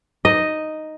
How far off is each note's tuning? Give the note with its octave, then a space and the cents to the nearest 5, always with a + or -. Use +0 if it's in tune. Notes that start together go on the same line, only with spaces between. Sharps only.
D#4 +0 D#5 +0